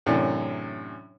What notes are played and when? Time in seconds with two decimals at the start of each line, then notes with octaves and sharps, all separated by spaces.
0.06 F#2 A2 C3 E3 D4